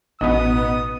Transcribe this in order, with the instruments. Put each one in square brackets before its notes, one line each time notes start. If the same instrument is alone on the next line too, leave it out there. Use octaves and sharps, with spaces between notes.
[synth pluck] A1 B2 [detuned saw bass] B3 [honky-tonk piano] D#4 [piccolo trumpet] D#6